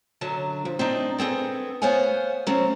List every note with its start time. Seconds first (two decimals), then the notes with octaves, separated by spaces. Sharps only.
0.21 F#2 D3 F#3 A5
0.65 F3
0.79 C4 D4 D#4
1.18 B3 C4 G#4 A4
1.82 B3 C5 C#5 F5 F#5 G#5
2.47 F#3 A3 C4 C#4